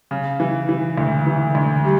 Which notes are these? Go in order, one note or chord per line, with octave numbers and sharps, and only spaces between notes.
C#3
E3
E3
D2
E3
D2
G3